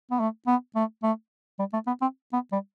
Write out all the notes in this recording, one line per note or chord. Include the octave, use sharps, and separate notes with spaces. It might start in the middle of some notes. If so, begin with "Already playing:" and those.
B3
A3
B3
A3
A3
G3
A3
B3
C4
B3
G3